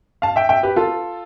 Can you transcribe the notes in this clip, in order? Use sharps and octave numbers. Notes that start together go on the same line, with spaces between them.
F5 A5
E5 G5
E5 G5
G4 B4
F4 A4